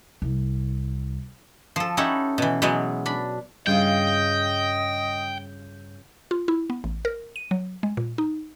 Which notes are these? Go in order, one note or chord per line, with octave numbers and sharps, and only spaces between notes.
C2
F3 A4
C#4 D#4 E4 G4 A4 F#5
B2 E3
B2 E3 F#3 G#3
D4 B5
G2 C#3 F4 G#4 D#5 G5 G6
F4
E4
B3
A1
A#4
D#7
F#3
G#3
A#2
D#4